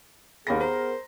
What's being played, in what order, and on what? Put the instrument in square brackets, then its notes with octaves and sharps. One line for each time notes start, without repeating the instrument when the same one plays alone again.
[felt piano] D#2 B5 A#6 [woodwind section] B3 G#4 A#4
[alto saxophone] C5 [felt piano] A#5